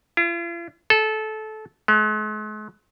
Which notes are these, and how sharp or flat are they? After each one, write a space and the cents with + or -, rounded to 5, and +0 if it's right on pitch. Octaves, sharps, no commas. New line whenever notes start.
F4 -45
A4 -20
G#3 +45